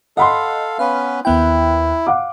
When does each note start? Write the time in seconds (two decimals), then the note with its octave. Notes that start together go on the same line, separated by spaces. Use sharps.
0.17 A4 D#5 F5 F#5 B5 C6
0.79 B3 C#4 B4 F5
1.25 D#2 B3 E4 G5
2.07 F5 F#5 D6